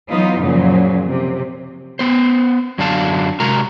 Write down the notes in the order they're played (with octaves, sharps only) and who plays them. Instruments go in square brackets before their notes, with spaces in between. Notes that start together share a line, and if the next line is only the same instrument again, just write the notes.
[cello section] E3 F#3 B3 D#4 F4
F#2 A#2 C#3 F3 F#3
C3
[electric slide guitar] B3 C5
F#2 D3 F#3 D4 F5 A5
C3 G#3 F#4 A#4 A#5